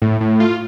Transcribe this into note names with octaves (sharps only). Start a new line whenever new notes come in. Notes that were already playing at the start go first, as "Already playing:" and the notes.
A2
A2
F4